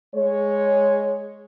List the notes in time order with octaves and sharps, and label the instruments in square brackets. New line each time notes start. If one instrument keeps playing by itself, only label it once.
[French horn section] G#3 C#5